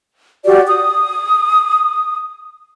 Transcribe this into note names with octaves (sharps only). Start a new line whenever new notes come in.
F#4 G4 D5
D#6